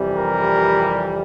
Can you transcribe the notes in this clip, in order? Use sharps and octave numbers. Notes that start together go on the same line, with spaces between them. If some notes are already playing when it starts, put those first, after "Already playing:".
Already playing: F2 C3 E3 G3
A#4